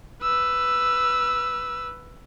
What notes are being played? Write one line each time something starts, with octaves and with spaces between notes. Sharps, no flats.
B4 E6